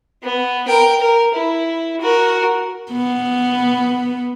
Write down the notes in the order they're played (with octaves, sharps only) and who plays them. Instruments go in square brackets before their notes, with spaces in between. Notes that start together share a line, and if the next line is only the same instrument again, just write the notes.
[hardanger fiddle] B3
A#4 G5
A#4
E4
F#4 A#4
[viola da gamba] B3